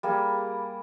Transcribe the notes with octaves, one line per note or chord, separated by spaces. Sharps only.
G3 A#3 G#4